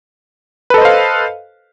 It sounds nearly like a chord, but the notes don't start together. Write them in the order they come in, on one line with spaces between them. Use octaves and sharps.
B4 A4 D#5 C5 F5